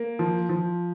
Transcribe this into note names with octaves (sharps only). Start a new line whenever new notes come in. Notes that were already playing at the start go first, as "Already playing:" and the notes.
Already playing: A#3
F3
F3